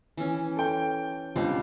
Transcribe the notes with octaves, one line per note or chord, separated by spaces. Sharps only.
E3 C#4
A4 G5
C#2 G3 C4 D4